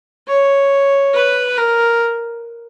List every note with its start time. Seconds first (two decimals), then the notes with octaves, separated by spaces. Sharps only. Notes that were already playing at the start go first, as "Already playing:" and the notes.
0.27 C#5
1.14 B4
1.57 A#4